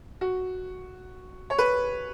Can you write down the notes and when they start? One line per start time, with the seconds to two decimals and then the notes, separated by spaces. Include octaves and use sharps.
0.21 F#4
1.50 C#5
1.58 B4